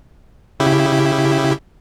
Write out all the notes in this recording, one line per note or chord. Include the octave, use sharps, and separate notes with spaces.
C#3 E4 G4